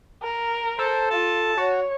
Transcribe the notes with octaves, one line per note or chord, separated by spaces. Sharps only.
A#4
A4 C5
F4 A5
F#4 C#5